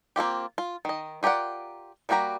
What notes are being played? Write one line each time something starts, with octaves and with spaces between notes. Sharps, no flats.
A#3 C4 F4 G4
F4
D#3 D#5
F4 G4 A#4 D5 F#5
G3 A#3 F#4 G4 A#5